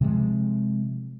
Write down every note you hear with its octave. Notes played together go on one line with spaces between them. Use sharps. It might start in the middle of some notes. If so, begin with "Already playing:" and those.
C3 F3 G#3